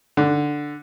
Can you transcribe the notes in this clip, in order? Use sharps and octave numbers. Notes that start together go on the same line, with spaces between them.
D3